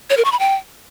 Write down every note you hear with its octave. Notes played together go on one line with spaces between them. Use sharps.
C#5
A#4
C#6
B5
G5